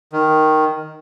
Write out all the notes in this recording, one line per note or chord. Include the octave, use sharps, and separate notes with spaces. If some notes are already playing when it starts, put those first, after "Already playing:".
D#3